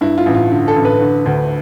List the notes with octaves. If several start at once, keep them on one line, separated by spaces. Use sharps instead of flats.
G2 E4
F4
A1
F4
D3
A4
A1
B4
D3
D2